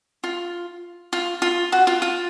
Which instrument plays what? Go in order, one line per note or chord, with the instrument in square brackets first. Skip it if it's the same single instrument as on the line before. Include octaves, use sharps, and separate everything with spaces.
[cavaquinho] F4
F4
F4
F#4
F4
F4